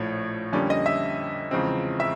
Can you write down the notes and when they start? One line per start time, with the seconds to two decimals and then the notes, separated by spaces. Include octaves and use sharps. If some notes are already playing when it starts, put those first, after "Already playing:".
Already playing: A#1 A2 F3 C#5
0.53 F2 D3 G3 A#3 C#4 D5
0.70 D#5
0.86 E5
1.51 E2 C#3 F3 G#3 C4
2.00 E5